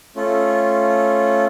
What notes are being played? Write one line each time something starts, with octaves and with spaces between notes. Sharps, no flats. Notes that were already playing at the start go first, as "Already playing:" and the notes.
A3 C#4 F4